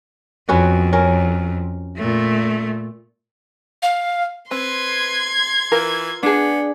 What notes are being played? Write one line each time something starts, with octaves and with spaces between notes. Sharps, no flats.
F2 B3 C#4 F#4
C#4 A#4
A#2 A3
F5
C4 B4 C6 G#6
E3 F4 A#4
B3 D4 G#4